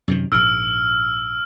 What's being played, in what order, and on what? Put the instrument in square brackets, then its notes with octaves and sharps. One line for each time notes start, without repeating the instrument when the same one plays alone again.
[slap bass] F#2 C3 D#3
[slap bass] A#1 G#2 [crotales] E6 F6 D7